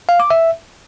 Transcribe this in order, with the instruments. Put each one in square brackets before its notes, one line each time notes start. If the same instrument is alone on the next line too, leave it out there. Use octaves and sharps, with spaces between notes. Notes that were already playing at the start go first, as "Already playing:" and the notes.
[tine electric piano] F5
D6
E5